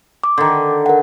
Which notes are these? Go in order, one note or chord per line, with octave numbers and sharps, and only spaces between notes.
D6
D3 D#3
A#4 F#5